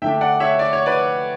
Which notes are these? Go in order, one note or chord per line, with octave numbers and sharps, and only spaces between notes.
D3 A3 D4 E5 G5
D5 F#5
C#5 E5
D5
C#5
B4 D5